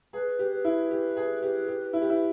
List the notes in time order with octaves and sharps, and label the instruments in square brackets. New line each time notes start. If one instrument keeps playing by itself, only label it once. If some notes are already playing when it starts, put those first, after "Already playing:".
[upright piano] G#4 [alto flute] B4
[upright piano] G4
[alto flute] B4
[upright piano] E4
G4
G#4
G4
G4
E4
G4
E4